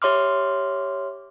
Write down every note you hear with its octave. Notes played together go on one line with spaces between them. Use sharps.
G4 C#5 E5 C6 D6 F6